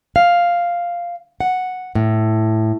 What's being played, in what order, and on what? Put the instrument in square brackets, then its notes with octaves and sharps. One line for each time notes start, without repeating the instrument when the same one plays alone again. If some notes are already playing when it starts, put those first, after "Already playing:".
[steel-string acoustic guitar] F5
F#5
A2